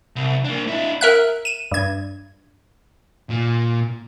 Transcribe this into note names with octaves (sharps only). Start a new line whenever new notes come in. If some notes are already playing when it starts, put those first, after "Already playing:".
C2
A#3 D4
D4 E4
A#4 E5 F#6
D#7 E7
G2 G#6
A#2